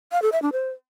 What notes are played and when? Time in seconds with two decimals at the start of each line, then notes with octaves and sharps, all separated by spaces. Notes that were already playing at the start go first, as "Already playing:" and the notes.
0.12 F5
0.22 A4
0.32 E5
0.42 D4
0.52 C5